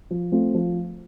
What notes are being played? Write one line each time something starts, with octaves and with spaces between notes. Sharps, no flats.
F3
A3 C4 F4
F3